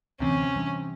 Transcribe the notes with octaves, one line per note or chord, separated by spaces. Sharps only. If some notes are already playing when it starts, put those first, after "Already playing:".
D2 C3 E3 C4 C#4
E3 G3 D4